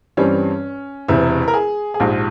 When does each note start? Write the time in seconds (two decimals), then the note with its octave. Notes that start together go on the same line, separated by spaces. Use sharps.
0.17 G2 E3 G3 C4 C#4
1.08 E1 E2 C3 E4
1.48 A#4
1.54 G#4
1.94 G#4
2.00 A#1 G#2 F3 G4